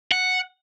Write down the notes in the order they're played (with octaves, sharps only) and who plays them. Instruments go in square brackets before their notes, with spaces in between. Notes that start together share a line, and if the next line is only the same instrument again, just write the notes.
[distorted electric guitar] F#5